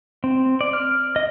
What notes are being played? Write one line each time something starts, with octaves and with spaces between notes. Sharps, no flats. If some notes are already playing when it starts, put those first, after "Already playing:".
C4
D5
F6
D#5